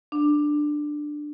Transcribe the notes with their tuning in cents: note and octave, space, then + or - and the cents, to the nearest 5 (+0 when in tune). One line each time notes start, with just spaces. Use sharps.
D4 +15